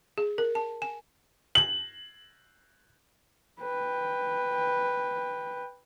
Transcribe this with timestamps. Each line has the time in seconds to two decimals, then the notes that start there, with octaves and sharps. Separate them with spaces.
0.18 G#4
0.38 A#4
0.55 A5
0.82 G#5
1.55 F#7
3.62 B4 G5